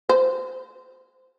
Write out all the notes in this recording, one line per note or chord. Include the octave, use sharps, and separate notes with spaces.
C5